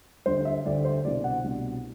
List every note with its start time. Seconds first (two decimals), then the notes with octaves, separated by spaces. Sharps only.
0.26 D2 D3 G3 C5
0.45 E5
0.65 D2 D3 G3 D5
0.85 C5
1.04 C2 B2 G3 D4 D5
1.24 F#5
1.44 C2 B2 G3 D4